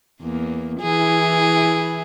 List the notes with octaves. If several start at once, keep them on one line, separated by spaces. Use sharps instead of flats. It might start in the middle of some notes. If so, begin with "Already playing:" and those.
E2 A#3
E3 E4 G#4